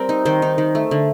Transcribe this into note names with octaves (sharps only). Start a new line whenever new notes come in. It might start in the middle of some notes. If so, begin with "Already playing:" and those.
Already playing: G3 C4 G4 A#4
D#4
D#3 C5
D#4
D#3
A3
D3